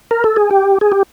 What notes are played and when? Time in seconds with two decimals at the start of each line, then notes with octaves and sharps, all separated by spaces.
0.11 A#4
0.24 A4
0.36 G#4
0.51 G4
0.81 G#4
0.92 G4